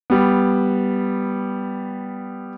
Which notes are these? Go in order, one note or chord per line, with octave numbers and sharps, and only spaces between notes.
G3 B3